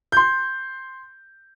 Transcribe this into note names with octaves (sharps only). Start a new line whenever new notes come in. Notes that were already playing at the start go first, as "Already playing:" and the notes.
C6 G6